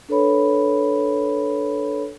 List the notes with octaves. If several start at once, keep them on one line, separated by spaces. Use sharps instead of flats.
D4 A4 B4 C#5 B5